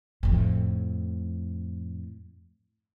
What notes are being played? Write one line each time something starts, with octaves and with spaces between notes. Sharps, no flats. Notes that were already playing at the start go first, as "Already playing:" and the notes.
F2 A2